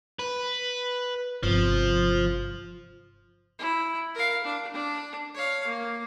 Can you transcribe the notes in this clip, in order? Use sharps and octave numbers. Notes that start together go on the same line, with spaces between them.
B4
G1 C3 F3
E4
A#4 F5
D4
D4
C#5 F5
A#3